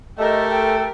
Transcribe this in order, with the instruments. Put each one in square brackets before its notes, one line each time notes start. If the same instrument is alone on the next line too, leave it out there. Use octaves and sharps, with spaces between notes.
[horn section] A3 A4 [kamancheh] G4 A#4 [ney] D#5
[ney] G5